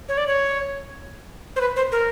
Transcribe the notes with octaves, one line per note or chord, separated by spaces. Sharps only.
C#5
D5
C#5
C5
B4
C5
A#4